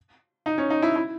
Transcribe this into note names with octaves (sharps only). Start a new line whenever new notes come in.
D#4
C#4
D#4
E4
E4